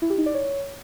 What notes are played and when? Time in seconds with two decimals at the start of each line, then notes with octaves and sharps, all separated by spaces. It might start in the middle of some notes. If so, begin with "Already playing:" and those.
0.02 E4
0.10 G4
0.18 D#4
0.26 D5
0.34 C#5